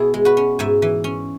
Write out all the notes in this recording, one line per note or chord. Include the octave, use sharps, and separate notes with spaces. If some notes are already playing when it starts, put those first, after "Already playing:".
Already playing: B2 B3 E4 G#4
G#3
F#4 B4
C#4
G#2 E5 G#5
E3
C#4